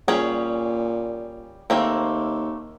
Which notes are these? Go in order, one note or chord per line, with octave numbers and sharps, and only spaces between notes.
A#2 G3 C#4 G#4
D#2 A3 A#3 C4